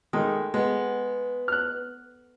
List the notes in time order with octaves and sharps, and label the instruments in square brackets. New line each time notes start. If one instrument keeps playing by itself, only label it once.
[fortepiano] D#3 G#3 [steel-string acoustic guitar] A3
[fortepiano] G#3 [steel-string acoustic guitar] B3
[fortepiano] F6 F#6